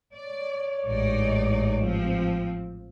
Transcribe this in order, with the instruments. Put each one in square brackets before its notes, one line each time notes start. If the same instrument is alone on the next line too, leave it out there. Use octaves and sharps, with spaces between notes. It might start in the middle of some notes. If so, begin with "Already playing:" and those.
[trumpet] C#5 [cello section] D5
[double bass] A1 G#2 [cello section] D#4 D5
[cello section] F3 C4